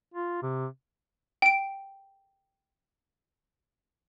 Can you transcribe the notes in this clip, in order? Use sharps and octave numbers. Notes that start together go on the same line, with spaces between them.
F4
C3
G5 D7